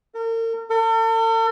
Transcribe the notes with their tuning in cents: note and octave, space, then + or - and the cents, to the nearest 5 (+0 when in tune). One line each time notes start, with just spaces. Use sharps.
A#4 -40
A4 +45